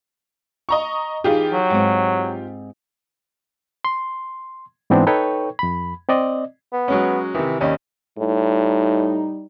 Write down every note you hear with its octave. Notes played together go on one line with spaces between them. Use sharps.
D#5 A#5 C#6
E3 D#4 F4 G4 G#4
F#3
G#2 C4
C6
G#2 E3 B3 C4 D4
D#4 A4 B4 C#5 G5 C#6
F2 B5
C4 D5 D#5
B3
F#3 G#3 C#4
C3 D#3 E3
D#2 G3 C#4 D#5
A2 G3 D#4